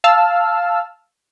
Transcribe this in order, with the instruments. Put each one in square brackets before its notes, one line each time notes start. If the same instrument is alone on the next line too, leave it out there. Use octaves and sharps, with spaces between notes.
[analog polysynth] F5 A5 E6 F6